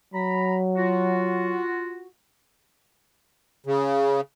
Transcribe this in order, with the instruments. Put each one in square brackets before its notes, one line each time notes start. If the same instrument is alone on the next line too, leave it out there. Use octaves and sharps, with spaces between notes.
[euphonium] F#3 [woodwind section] A#5 B5
[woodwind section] F4 F#4
[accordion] C#3